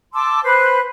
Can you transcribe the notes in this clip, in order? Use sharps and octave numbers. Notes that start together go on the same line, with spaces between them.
A5 C6 D6 E6
B4 C5 B5 F#6